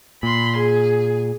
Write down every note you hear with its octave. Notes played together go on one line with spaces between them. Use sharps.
A#2 B5 C6
G#4